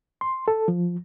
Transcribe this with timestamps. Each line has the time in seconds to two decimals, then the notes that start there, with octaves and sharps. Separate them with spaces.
0.21 C6
0.48 A4
0.68 F3